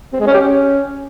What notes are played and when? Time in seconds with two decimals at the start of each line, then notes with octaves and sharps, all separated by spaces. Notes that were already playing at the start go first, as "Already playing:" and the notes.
0.13 C4
0.20 G#3
0.27 C#4
0.34 G4
0.41 C#4